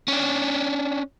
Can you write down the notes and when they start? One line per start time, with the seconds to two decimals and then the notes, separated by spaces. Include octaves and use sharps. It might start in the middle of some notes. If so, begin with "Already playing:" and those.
0.08 C#4 D4